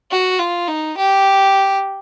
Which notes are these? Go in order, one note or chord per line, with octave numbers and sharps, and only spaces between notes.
F#4
F4
D#4
G4